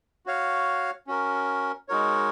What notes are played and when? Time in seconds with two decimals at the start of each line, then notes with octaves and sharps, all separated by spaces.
0.26 F#4 C#5 F5
1.07 C#4 F#4 A#4
1.89 G#3 D#4 F#4 A#4 C#5